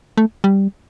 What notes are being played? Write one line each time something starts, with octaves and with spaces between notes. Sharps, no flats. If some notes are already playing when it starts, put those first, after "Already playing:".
A3
G3